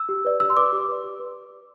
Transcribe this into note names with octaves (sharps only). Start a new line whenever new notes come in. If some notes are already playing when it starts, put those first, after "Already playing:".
Already playing: E6
G4
B4 D5
G4 E6
C6
B4 D5 D6
G4
B4 D5
G4
B4